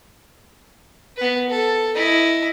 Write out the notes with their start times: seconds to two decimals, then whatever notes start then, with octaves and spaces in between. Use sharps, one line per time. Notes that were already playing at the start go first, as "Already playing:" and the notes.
1.17 B3 B4
1.49 A4
1.96 E4 D#5